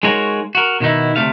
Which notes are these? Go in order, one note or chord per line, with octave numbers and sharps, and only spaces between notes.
G#3 D#4 F4 F#4 A#4 C#5
F#4 A#4
B2 D#3 B3 D#4 E4
D2 C3 A3 F5